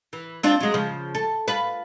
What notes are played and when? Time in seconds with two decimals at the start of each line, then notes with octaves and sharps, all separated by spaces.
0.13 E3
0.43 C4 D4 F4
0.61 F#3 G#3
0.74 C#3 F3
1.15 A4
1.48 F4 B4